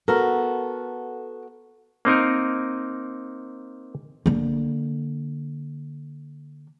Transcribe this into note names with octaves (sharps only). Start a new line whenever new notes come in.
B3 F#4 A4 A#4
A#3 C4 D#4 A#4
D3 A#3